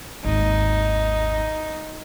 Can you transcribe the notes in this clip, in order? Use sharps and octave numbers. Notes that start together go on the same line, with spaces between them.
G#1 D#2 D#4